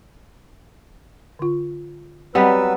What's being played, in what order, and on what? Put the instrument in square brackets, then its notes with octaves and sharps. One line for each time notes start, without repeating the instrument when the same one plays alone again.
[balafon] D3 F4
[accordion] F#3 B4 E6 [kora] G3 B3 [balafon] C4 D5 D#5